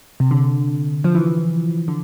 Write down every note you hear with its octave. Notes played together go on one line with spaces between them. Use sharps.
C3
D3
F3
E3
D3